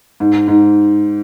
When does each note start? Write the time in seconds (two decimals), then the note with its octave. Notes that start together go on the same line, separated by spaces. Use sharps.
0.20 G#2
0.48 G#2